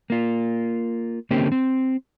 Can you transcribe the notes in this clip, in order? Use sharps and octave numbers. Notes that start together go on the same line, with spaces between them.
A#3 F4
D3 A#3 C4 C#4 G4
C4